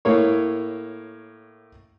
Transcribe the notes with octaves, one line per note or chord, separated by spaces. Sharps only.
A2 A#3 C#5